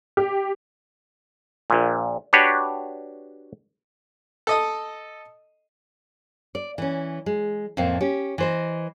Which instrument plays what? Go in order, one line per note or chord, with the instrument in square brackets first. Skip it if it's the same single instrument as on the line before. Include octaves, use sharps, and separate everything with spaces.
[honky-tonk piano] G4
[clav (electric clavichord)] A#1 A#2
D4 F#4 G4 B4 C#5
[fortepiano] A4 D#5 D#6
[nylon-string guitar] D5
E3 C#4
G#3
F2 A2 A#3 C4
C#4 G4
E3 C5 D#5